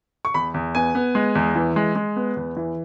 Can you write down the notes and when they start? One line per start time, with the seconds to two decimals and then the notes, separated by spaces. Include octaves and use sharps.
0.25 C#6
0.34 E2 B5
0.54 E2
0.75 B3 G#5
0.95 B3
1.15 G#3
1.35 E2
1.55 E3
1.76 G#3
1.96 G#3
2.16 B3
2.36 E2
2.57 E3